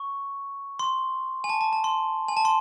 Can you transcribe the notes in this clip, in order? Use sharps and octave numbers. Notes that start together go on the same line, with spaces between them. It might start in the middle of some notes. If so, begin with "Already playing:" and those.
Already playing: C#6
C6
G#5
A5
A5
A5
C6
G#5
A5
C6